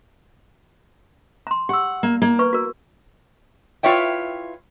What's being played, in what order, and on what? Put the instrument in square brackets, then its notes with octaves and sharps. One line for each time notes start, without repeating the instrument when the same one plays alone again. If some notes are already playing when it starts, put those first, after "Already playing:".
[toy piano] A#5 C6
[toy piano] G4 E6 [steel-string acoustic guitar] F#5
[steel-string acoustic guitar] A#3
[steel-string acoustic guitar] A#3 [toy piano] E4
[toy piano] B4 C#6
F#4 A#4
[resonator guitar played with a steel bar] E4 F4 B4 C#5 E5 G5